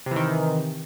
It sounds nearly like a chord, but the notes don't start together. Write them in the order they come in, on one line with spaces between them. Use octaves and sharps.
C3 E3 D#3